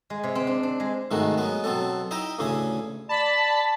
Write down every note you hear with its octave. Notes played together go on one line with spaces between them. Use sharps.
G#3
C3
C4
D4
D4
G#3
G#2 C3 D#3 G#3 A3 F#4
F#3 G#3 B3 B4
B2 F#3 B3 C4 A4
D#4 E4 D#5 E5 G5 A#5
A1 D2 C#3 C#4 E4 G#4
D5 A5 B5